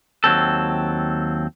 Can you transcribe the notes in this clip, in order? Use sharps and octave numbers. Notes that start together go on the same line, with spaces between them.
D#2 F#3 C4 A4